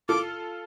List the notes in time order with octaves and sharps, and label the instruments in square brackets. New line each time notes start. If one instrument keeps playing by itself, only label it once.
[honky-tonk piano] F4 A4 [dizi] D6